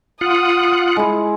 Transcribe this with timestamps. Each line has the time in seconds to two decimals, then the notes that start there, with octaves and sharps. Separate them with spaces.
0.21 F4 F#5 D#6
0.96 G#3 E4